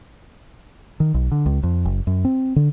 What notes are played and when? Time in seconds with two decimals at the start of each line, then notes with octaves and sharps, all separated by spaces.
1.00 D#3
1.14 B1
1.32 D3
1.46 C#2
1.63 F2
1.85 F#1
2.07 F#2
2.25 C4
2.56 D3